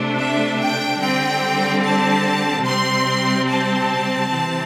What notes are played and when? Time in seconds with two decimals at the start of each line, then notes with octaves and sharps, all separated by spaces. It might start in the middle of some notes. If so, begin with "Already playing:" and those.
Already playing: C3 A3 D4
0.17 E5
0.58 G5
0.99 D3 G3 C4 G5
1.82 A5
2.65 C3 G3 C4 C6
3.48 A5
4.30 C3 E3 C4